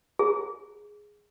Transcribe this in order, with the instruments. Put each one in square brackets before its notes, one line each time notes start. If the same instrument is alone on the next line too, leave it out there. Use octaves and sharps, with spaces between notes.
[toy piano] G#4